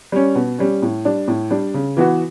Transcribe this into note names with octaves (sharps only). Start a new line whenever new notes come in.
G3 C#4
B2
G3 C#4
A2
G3 D4
A2
G3 D4
C#3
E3 B3 F#4